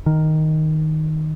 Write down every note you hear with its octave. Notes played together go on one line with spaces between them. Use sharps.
D#3